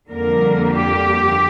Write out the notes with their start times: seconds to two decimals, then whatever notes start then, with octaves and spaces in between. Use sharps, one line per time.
0.10 F2 D3 G3 A#3 A#4
0.71 G4